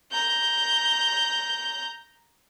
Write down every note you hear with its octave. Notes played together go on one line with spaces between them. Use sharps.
A#5 G6